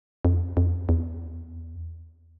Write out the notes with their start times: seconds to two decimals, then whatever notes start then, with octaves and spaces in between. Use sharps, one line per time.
0.25 F2
0.57 F2
0.89 E2